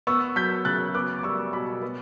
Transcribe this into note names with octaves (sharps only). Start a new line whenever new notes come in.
B3 C#6 E6
F#3 G6 B6
C#3 F#6 A6
B3 D6 F#6
D6
G3 C#6 E6
B2 B5 D6
B3